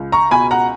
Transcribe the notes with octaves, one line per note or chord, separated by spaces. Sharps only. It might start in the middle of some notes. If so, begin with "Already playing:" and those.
Already playing: C#2
A#5 C#6
B2 G#5 B5
F#5 A#5